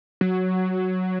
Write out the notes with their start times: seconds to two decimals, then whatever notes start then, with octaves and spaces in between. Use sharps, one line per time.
0.21 F#3